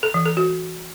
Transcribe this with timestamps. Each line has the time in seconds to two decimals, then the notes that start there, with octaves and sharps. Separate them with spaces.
0.03 A4
0.14 E3
0.26 A4
0.37 F#4